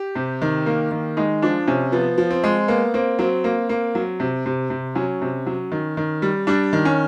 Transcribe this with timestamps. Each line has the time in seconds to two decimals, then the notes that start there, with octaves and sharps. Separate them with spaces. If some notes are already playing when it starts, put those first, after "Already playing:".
Already playing: G4
0.15 C3
0.42 D#3
0.66 A#3
0.91 D#3
1.17 G#3 D#4
1.42 F3 D4
1.67 C3 C#4
1.92 F3 B3
2.18 F3
2.31 C4
2.44 G#3
2.68 A#3 B3
2.94 A#3 C4
3.19 F#3 C4
3.44 A#3
3.69 A#3
3.95 F#3
4.20 C3
4.46 C3
4.70 C3
4.95 F#3 C#4
5.22 C3
5.46 F#3
5.72 D#3
5.97 D#3
6.22 G3
6.47 G3 D4
6.73 D#3
6.85 C#4